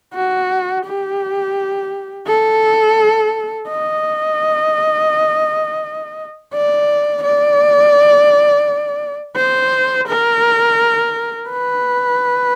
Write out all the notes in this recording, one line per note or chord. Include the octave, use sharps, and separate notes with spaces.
F#4
G4
A4
D#5
D5
D5
C5
A#4
B4